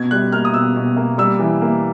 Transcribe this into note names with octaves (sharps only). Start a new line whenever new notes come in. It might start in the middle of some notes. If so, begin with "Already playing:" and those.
Already playing: B2 G#6
G3 F#6
A#3 F6
D#6
B2 E6
B2
A#3
G3 E6
E3
A#3